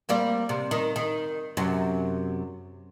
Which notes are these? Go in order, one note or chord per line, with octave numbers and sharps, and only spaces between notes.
G3 A#3 C4
C3
D#3
D#3
F#2 C3